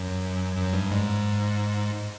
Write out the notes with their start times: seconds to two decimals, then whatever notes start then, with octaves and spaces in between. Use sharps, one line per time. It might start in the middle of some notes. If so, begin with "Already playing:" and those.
Already playing: F#2
0.57 F#2
0.73 G2
0.91 G#2